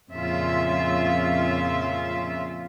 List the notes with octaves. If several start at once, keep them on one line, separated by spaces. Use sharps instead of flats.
F2 A#2 C#3 F4 E5